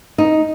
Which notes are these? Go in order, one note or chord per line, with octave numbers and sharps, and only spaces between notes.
D#4